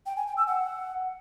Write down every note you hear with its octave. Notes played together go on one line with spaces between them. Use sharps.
G5
G#5
G5
E6
F#5